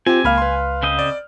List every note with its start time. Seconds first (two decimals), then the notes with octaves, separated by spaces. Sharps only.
0.06 C4 F4 G4 G#5
0.24 C#2 A#3 F5 B5 F6
0.38 B4 C6
0.83 C#3 C4 D#5
0.99 D5